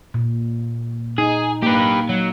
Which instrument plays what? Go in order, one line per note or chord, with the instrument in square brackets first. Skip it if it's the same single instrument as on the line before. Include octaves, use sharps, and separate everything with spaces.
[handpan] A#2
[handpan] D#4 [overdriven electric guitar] G#4
[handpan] A#3 [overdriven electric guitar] G4 B4
[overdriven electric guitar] F#3